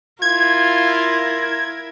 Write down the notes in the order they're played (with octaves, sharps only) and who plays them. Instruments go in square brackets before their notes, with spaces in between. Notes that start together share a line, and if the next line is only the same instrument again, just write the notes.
[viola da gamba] E4 A#4 [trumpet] F4 [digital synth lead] G#6